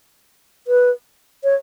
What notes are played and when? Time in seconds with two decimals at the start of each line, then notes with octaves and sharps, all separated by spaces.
0.67 B4
1.44 C#5